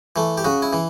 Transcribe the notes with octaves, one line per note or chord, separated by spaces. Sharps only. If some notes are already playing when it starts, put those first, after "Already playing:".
E3 A3
G4
C#3 F#4
E4
E3